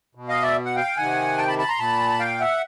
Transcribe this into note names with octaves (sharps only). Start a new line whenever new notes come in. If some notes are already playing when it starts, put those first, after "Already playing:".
B2
D#5 F5
D5 E5
F#5
F5 G5
C3 D#3 F#5 G#5
G5 A5
A5 B5
A5 B5
A#5 C6
A#2 A5 B5
F5 G5
E5 F#5